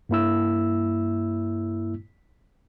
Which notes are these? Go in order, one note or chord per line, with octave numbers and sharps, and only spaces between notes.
G2 A#3 E4 E6